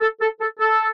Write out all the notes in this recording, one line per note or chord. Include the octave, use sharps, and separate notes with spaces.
A4
A4
A4
A4